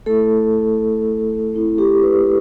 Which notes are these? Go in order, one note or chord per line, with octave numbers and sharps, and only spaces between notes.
A3 E4 A4
A3 C4 E4
G4
B4